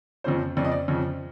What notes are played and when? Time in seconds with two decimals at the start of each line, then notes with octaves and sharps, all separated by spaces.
0.24 F2 C#3 F3 C5
0.57 F2 C#3 F3 D5
0.64 D#5
0.72 D5
0.88 F2 C#3 F3